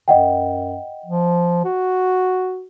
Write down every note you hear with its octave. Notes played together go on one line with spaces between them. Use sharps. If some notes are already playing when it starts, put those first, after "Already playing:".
F#2 D#5 F#5 G5
F3
F#4